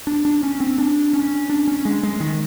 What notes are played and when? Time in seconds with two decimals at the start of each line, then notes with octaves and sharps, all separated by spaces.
0.07 D4
0.25 D4
0.43 C#4
0.60 C4
0.78 D4
1.13 C#4
1.50 D4
1.68 C#4
1.85 G#3
2.03 G#3
2.20 D#3